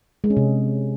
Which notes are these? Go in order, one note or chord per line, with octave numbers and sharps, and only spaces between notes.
G#3
C#4
C3